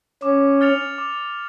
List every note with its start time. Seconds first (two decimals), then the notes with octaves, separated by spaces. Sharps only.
0.22 C#4 D6
0.61 F6 A6 C#7 F7
0.98 D6